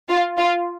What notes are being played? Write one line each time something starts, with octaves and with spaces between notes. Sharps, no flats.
F4
F4